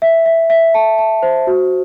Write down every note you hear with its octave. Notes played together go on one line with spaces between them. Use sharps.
E5
E5
E5
A5
A5
C5
F#4